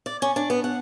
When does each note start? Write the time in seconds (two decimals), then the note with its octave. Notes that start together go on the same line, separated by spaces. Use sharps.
0.06 D5
0.22 C#4
0.36 D4
0.50 B3
0.64 F#5